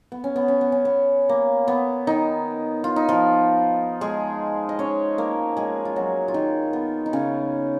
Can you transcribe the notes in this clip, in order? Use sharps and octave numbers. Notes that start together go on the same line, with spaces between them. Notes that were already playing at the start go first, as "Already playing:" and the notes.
B3
C#4
B3
C#4
B3
C#4
B3
A#3
B3
D#3 D#4
F4
D#4
F3 F4
G#3 G#4
D#5
C#4 C#5
A#3 A#4
G#3 G#4
F4
F#3 F#4
F4
D#3 D#4
B3
D#4
C#3 C#4